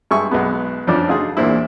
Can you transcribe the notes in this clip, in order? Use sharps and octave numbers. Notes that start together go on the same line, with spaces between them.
G2 G#3 E5 G#5 C#6
B1 G#3 B3
F2 F3 C#4 D4 D5 D6
A3 D4 D#4 F4 F#4 G#4
E2 A#2 A#3 C4 D4 E4